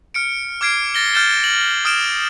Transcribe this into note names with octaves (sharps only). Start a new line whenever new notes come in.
F6 C#7 D7
D6 F6 G#6 C7 D7
A6 A#6 G7
F6 G6 A6 E7 G7
F#7
D#6 F6 D7 E7